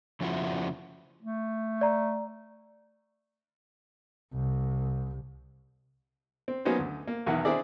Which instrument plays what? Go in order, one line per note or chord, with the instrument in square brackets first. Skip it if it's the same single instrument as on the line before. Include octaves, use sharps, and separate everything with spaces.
[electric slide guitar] F2 C#3 F3 E4 F#4 E5
[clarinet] A3
[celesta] D5 A#5
[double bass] C2
[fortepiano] C4
F#3 A#3 B3 C#4 D#4 C5
D2
A#3
B1 E2 D#3 E4 F#5
C4 D4 E4 G#4 D5